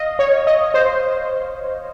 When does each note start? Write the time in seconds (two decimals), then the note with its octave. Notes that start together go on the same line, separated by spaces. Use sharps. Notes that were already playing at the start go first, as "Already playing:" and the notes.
Already playing: D#5 F5
0.19 C#5
0.47 D#5
0.74 C5